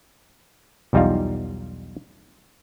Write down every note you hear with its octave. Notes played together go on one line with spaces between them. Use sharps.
B1 E2 G3 D#4 F4 F5